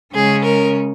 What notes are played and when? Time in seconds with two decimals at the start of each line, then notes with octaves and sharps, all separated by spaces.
0.13 C#3 G#3 C#4 G#4
0.44 A#4